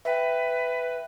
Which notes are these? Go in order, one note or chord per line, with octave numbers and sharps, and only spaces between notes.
B4 E5 G5